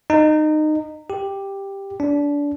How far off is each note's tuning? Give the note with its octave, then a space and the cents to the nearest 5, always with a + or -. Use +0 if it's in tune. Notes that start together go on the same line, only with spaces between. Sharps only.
D#4 -20
G4 +5
D4 -25